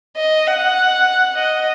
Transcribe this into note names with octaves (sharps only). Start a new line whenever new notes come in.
D#5
F#5
D#5